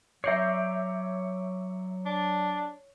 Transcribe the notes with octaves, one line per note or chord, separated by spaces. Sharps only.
F#3 C#5 D5 E5 A#5 G6 C7
D4